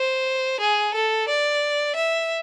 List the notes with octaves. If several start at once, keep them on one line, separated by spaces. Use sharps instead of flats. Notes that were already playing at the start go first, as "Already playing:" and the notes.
Already playing: C5
G#4
A4
D5
E5